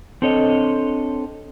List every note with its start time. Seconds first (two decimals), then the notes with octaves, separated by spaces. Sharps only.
0.22 C4 D4 A4 C#5 D#5